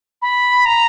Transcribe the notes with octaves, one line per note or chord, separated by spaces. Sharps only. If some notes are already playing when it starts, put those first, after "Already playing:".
B5
A#5